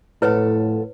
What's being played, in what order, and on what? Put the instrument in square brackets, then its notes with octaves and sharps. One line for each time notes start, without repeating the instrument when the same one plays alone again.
[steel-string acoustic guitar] F2 A4 F#5 [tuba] A2 [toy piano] E4 B4 C#5